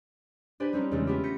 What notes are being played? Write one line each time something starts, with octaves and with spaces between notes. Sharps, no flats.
D4 G4 B4 C5 G#5
G3 C4 C#4 D#4
E2 C#3 E3 G#3 A3
B3 E4 F4 G4
G6 A#6 B6 C#7 D#7